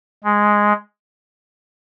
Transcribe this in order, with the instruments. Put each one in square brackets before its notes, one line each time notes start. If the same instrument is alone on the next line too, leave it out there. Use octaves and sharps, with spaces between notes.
[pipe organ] G#3